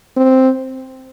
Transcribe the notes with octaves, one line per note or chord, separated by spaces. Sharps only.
C4